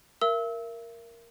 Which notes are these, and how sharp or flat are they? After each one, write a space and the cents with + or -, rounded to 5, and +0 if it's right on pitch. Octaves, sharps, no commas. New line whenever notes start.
A#4 +0 E5 +35 E6 -30